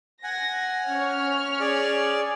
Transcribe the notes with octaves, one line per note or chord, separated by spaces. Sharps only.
F#5 G#5 A#6
C#4 C#5 F6
G#4 D5